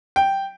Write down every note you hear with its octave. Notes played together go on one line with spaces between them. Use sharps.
G5